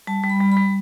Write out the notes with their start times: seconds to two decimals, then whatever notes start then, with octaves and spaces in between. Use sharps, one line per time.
0.07 G3 A5
0.23 G3
0.30 B5
0.41 G3
0.52 G3 B5